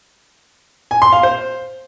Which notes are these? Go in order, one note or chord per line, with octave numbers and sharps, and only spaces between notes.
G#5
C6
F5
C5